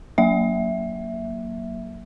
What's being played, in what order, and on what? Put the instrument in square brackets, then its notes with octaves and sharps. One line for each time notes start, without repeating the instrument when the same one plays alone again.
[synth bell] F#3 A#3 E5